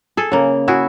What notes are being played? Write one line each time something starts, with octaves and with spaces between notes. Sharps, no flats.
G#4 A4
C#3 A#3
E4 F#4 G#4